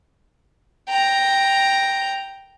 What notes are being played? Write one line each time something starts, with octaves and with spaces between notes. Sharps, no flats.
G5 A#5